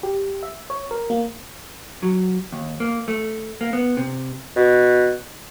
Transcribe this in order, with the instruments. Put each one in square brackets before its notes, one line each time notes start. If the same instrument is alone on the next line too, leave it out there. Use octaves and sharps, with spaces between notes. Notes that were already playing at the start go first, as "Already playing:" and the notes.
[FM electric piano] G4
E5
C#5
A#4
A#3
[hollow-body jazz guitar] F#3
D#2
A#3
A3
A#3
B3
C3
[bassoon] B2